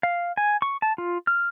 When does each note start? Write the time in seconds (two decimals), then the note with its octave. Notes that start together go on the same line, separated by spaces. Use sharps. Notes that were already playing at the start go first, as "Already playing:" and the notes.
0.03 F5
0.37 G#5
0.62 C#6
0.82 A5
0.98 F4
1.27 F6